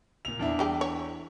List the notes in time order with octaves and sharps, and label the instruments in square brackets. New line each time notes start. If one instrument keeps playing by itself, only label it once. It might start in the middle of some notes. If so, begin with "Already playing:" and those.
[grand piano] A#2 F7
E2 D4 E4
[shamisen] G3 G4 G#4
C#5